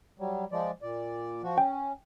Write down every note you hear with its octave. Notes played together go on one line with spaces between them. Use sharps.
F#3 G3
F3 G#3 D5
A#2 D5
F3 F#4
C#4 G5